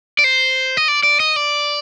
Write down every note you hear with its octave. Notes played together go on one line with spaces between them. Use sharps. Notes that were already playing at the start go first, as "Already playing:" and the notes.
D5
C5
D#5
D5
D5
D#5
D5